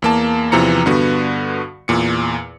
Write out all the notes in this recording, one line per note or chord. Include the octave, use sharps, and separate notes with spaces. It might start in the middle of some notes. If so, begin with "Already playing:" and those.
E2 A#3 A5
E2 C3 E3 F3 A#5 C#7
G2 D3 B3 F#4
E2 A#2 C#7